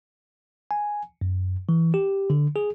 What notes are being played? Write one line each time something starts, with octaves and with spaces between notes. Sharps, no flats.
G#5
F#2
E3
G4
D3
G#4